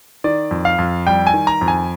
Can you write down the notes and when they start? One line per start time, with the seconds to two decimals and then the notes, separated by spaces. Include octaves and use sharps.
0.24 D#3 D5
0.51 F2
0.65 F5
0.78 F2
1.06 G3 G5
1.27 G#5
1.34 D#3
1.47 A#5
1.61 F2
1.68 G#5